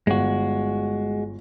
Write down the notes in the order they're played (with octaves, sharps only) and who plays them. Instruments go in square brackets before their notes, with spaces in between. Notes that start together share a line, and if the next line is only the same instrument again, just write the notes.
[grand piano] G1 [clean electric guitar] G#3 F#4